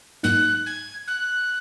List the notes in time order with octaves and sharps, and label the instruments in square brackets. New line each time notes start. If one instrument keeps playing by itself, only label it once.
[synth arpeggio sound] G#2 F#3 A#3 D#4 [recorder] F#6
[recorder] G#6
F#6